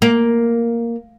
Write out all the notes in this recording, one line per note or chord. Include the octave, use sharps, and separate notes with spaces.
A#3